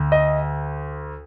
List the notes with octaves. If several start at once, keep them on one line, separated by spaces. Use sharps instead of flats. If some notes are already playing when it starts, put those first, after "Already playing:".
Already playing: D2
D#5